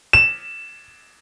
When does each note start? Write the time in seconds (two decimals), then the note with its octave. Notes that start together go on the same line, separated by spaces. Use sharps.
0.13 E7